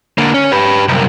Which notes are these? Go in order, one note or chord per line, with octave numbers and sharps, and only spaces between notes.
D3 A#3
C#4
G4 B4
C2 F#2